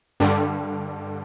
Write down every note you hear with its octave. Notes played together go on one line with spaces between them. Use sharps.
G2 D3 G3